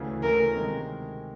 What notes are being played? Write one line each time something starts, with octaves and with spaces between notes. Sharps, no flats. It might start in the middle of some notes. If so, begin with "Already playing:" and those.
Already playing: D2 C#3 E3 A3
D2 C#3 E3 A3 A#4
C3 D#3 G#3